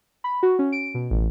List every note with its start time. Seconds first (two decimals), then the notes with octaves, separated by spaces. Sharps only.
0.24 B5
0.43 F#4
0.59 C#4
0.72 D7
0.94 B2
1.11 A1